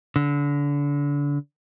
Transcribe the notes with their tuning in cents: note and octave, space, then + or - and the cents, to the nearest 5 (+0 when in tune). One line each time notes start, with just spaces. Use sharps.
D3 -30